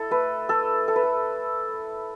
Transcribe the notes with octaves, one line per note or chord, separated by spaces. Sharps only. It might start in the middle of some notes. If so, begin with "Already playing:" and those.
Already playing: E4 A4
A3 B4
A3 A4
A3 A4
B4
A4